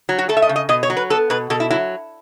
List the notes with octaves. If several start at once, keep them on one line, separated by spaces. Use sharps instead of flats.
F#3
F#4
A3 A4
E5
D#5
C#3
D#5
B2 D#5
C#5
F#3
B4
B3 A4
B2 B4
B2 A4
E4
F#3 E4